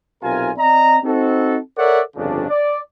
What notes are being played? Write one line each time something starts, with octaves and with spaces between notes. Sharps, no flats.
B1 C3 F4 A#4 G#5
C4 D5 D#5 A#5
C4 D#4 F#4 A4
A4 A#4 C#5 D5 E5 F#5
G1 F2 C#3 D4
D5